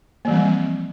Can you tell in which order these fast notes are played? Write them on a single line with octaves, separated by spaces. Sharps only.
A#3 E3 G3 C4 F3